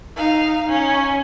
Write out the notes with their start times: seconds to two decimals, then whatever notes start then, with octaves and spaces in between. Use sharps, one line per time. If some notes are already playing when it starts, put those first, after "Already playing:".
0.16 D#4 F5
0.69 C#4